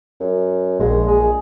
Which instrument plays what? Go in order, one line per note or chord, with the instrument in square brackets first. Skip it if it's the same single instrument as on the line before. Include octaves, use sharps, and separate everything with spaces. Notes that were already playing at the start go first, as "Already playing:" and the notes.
[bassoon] F#2
[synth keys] A#1 [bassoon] G#3
[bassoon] G#4